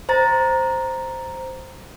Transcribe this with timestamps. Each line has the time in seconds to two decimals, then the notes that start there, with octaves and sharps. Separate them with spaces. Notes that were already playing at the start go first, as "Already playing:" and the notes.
0.09 C5 A#5 A6